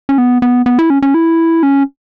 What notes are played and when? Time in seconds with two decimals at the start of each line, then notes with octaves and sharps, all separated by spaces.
0.09 C#4
0.18 B3
0.42 B3
0.66 B3
0.79 E4
0.90 C#4
1.02 C#4
1.14 E4
1.63 C#4